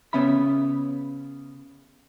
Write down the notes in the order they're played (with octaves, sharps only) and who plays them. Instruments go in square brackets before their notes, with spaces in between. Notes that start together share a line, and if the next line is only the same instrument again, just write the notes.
[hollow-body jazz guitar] C#3 B3 C#4 E5 B5